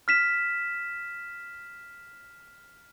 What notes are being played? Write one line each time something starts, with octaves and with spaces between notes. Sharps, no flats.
F6 B6 E7